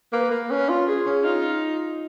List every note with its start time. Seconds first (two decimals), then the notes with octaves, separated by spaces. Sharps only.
0.12 A#3 B4
0.31 A#3
0.50 C#4 B4
0.69 F4
0.87 G#4
1.06 C#4
1.24 D#4 F4